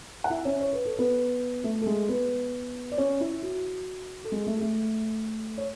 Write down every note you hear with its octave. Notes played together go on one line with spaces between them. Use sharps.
F#5
E4 E5
C#4 C#5
C#5
B4
A4
B3 B4
A3 A4
A4
G#3 G#4
B3 B4
D5
C#4 C#5
E4
F#4
A4
G#3 G#4
A3 A4
G#4
A3 A4
C#5